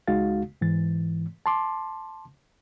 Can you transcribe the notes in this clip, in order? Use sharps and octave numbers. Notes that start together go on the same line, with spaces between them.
C#2 G#3 D#4 F#4 F5 A6
G#2 E3 A6
A5 C6 D6